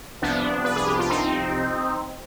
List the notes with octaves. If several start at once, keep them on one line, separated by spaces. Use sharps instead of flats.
C2 C3 F3 B3 D4
B4
G#4
G4
F4
C4 D#4